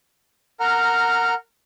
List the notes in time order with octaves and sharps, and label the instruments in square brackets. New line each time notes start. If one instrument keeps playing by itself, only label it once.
[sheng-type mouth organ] A#4 F#5 A#5 F6